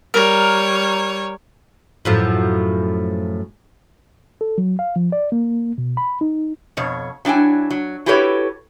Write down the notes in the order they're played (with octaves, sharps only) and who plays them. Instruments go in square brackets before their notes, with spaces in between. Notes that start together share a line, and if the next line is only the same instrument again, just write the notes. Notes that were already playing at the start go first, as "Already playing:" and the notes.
[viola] G3 C#5 [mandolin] A#4
[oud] F#2 A2 F3
[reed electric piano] A4
F#3
F5
F3
D5
A#3
B2
B5
D#4
[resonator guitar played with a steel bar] F2 B2 C#5
F#3 D4 E4 G5 G#5
F#3
E4 F#4 G4 A4 B4 C#5